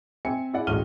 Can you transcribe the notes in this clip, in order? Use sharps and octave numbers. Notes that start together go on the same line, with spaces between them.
C4 E5 G#5 C#7
E4 G#4 D5 F#5
A1 D2 G#3 F6 D#7 G7